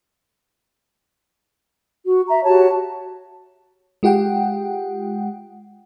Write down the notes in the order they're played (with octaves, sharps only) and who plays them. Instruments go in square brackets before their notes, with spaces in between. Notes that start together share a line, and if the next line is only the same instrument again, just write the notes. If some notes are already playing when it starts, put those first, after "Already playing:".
[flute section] F#4
E5 A#5
F#4 G4 C#5 A5
[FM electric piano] G#3 F4 G4 F#5 G5